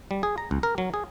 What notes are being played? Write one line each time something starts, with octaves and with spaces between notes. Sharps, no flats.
G3
G#4
A#5
C#2
A#4
F#3
G#4